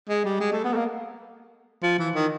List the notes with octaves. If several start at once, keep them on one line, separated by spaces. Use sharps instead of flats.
G#3
G3
G#3
A3
B3
A3
A#3
F3
E3
D#3